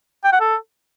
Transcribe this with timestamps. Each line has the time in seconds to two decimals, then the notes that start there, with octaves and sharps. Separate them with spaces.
0.24 G5
0.32 F#5
0.40 A4